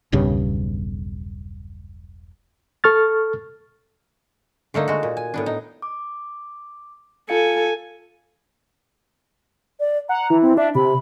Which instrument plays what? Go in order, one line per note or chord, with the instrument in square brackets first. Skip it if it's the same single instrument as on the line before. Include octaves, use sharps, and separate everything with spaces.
[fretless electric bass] E1 B1 G2 C#3
[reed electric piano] A4 C#6 F6 A6
[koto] D3 A3 A#3 D#4
G#3 F#4
A#2
G#5
A2 B3 D4
D#4
[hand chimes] D6
[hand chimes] F4 F5 C#7 [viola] A4 G#5
[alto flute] D5
[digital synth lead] F#5 [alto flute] A#5
[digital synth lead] E3
[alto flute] C4
[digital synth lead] D4 [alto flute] E5
[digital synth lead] C3 [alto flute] B5